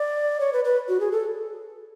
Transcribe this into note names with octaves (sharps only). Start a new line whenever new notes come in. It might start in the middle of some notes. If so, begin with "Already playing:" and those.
Already playing: D5
C#5
B4
B4
F#4
G#4
A4